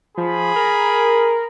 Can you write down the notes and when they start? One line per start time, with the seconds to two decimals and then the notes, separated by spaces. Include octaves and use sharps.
0.18 F3 G#4 B5
0.56 A#4